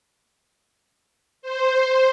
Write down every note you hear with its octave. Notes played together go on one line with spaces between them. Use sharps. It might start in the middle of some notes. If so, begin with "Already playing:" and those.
C5